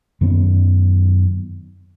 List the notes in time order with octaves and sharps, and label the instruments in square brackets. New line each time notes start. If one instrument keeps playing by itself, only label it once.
[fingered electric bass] F#2 D#3 B3 C#4